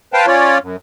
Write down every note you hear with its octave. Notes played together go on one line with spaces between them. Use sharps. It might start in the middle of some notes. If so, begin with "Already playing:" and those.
B4 C5 F5 G5 A5
C#4 F4 C#5 D5
F#2